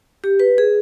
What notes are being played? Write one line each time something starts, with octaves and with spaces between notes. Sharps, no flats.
G4
B4
G#4